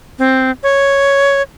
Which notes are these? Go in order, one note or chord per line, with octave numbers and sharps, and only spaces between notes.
C4
C#5